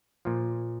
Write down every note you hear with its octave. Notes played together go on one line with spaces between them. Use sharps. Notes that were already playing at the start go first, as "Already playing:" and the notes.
A#2 F3